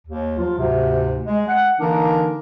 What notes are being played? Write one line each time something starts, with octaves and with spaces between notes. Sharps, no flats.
D#2
F3 F#3 F4
D2 G#2 C3
G#3
F#5
D3 E3 A#3 D4 D#4 A#4